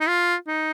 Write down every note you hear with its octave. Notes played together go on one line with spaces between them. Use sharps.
D#4
F4
D#4